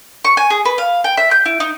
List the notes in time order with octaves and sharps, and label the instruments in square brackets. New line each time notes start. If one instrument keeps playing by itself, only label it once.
[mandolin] C#6
G#5
G#4
B4
F5
G5
E5
G6
E4
D#4